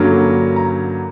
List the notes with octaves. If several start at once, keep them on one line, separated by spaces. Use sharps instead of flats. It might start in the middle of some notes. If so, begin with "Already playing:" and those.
Already playing: G2 D3 F#3 A#3 C#4
A#5